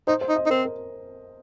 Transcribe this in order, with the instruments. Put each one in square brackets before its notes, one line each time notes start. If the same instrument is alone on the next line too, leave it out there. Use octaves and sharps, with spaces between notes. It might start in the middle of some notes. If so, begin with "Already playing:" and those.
[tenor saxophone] D#4 [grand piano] C5
[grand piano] C5
[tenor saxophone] D#4
[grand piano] D#5
[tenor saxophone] D#4
[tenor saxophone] C4 [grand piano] A#4
[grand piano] A#4